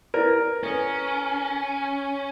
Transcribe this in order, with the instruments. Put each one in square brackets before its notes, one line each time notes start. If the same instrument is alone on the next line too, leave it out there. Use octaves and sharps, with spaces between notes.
[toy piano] E4 B4 D5 [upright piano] A#4
[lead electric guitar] C#4 [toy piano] A4 B4